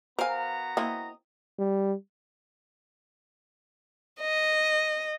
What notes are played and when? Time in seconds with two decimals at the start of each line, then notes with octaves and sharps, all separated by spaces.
0.19 B3 F#4 A#4 C5 F5 G#5 A#5
0.77 A#3 C4 E4 D#5
1.59 G3
4.21 D#5